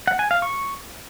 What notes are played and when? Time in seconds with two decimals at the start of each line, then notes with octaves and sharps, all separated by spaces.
0.07 F#5
0.19 G#5
0.31 F5
0.42 C#6